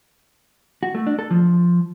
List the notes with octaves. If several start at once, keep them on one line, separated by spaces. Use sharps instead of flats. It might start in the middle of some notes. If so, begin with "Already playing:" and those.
F#4
A3
D4
A4
F3